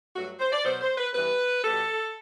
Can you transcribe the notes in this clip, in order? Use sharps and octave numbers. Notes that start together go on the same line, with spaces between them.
G2 F#3 A3 F#4
C5
D5
B2 F#3 B3 C5
C5
B4
G2 E3 B3 B4
B2 G3 B3 A4